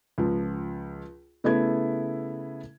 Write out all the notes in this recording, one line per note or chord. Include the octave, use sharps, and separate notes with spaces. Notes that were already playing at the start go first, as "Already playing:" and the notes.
C#2 F3
C#3 A3 B3 E4 G#6